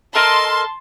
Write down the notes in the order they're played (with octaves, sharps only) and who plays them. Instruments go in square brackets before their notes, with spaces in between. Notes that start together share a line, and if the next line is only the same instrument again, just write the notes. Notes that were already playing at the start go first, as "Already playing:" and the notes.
[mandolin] A4 A#4 D#5 [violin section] A5 C6